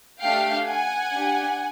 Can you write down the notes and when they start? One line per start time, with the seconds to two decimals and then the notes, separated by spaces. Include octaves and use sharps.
0.22 A3 D4 G4 F5 G5
0.67 F#5 G#5
1.13 D4 G4